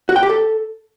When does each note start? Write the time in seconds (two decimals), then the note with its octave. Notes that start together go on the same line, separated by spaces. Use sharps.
0.09 F#4
0.16 G5
0.23 G4
0.30 A4